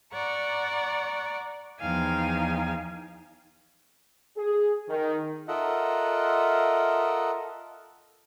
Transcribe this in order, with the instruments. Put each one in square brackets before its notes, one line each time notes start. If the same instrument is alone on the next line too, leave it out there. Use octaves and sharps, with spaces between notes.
[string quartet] D5 F#5 A#5 C#6
E2 F3 D#4 F5 G5 G#5
[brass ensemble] G#4
D#3
[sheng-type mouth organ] F4 A4 A#4 D#5 E5 F#5